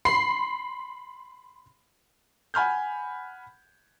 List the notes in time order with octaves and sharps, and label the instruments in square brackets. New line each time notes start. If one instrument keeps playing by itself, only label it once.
[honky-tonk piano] B5 C6 C7
[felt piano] F#5 G#5 B5 F6 G6